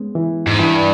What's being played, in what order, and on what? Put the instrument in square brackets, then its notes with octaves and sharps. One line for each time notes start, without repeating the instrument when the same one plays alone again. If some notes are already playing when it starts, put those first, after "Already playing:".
Already playing: [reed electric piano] G#3 B3 C#4
E3
[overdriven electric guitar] G#2
[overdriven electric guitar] G2 [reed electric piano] E3